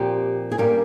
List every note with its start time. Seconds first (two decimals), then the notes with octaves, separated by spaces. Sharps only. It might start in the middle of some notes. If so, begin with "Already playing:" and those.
Already playing: A#2 F3 C4 G4
0.52 G#4
0.58 G2 G3 A#3 C#4 A#4